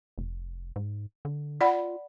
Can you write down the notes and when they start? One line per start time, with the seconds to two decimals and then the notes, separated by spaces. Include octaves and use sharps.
0.18 F1
0.76 G#2
1.25 D3
1.61 F4 D5 F#5 B5